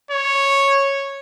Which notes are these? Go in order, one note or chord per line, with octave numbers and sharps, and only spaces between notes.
C#5